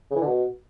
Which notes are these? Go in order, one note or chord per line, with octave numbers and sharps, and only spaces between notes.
C#3
E3
D3
B2